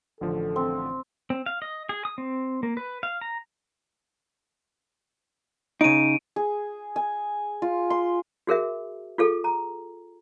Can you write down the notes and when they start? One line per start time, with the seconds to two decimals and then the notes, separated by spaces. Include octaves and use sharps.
0.21 A1 D3 F3 A4
0.56 C4
1.30 C4
1.46 F5
1.62 D#5
1.89 G#4
2.05 D#6
2.18 C4
2.63 A#3
2.77 B4
3.03 F5
3.21 A#5
5.81 C#3 D#4 D7 D#7
6.36 G#4
6.96 G#5
7.62 F4
7.90 C6
8.47 F#4 G#4 A#4 E5
9.18 F4 G#4 A4
9.44 A#5